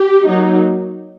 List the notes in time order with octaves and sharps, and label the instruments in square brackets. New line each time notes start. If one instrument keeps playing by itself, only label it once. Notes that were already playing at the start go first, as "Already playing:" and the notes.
Already playing: [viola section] G4
F#3 A#3 D#4